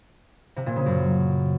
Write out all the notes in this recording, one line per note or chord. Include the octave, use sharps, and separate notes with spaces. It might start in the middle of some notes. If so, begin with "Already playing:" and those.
C3
A#2
C#3
F#2